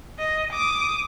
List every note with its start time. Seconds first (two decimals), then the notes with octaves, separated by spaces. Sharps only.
0.19 D#5
0.53 D6 D#6